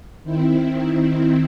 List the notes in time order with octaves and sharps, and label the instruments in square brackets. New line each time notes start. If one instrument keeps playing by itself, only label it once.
[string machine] D#3 C4 E4